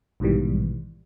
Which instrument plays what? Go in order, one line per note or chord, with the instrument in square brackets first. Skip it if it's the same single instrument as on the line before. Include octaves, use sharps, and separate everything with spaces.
[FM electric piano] A#1 G#2 B2 D#3 E3 G3